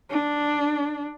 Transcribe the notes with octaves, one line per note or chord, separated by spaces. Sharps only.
D4